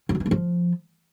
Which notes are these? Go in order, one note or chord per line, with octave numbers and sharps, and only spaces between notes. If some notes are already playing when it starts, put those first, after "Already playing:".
F#3
D#3
E3
A3
F3